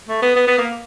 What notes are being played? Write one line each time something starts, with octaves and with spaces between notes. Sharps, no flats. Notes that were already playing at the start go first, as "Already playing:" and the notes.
A3
B3
B3
B3
A#3